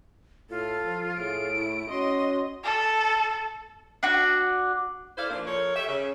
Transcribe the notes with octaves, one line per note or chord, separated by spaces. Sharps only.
A2 F4 A4
F3
A2 A3 G#4 D7
E4
C#4 F#4 D#5 C6
A4
D4 F#4
E4 A4 C5 D5 F5
A#2 F3 A#3 D4
F3 A4 A#4 C#5
G4 A4 E5
C#3